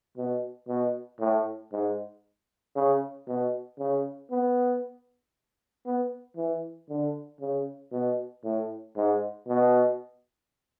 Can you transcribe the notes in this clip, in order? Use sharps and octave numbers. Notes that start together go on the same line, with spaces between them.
B2
B2
A2
G#2
C#3
B2
C#3
B3
B3
E3
D3
C#3
B2
A2
G#2
B2